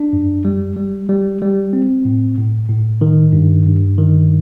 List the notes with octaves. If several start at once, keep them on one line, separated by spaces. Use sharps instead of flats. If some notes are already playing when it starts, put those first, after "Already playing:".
Already playing: D4
F#2
G3
G3
G3
G3
C4
A2
A2
A2
D#3
G2
G2
D#3